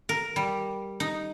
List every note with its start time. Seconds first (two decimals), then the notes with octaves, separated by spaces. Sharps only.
0.09 A#4
0.36 G3
1.00 D#4